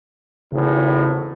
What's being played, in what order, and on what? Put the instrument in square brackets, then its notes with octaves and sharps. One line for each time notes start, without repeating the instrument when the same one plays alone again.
[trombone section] G#1 E2 A2 [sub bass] C#3